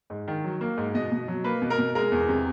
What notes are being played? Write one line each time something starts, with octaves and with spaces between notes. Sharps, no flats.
G#2
D#3
F#3
A#3
G#2
B2 D#5
B2
F#3
A#3 B4
B2
A#4
B2
G#3 A#4
E2
C3